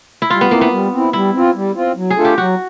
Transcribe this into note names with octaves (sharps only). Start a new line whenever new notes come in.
E4
G3 F4
B3
A#3 C4 E4
B3
G3
C4
E4
G3 E4
C4 F4
G3
C4 F4
F#3
G#4
A3 D4 F4 A4
G4
F#3 F#4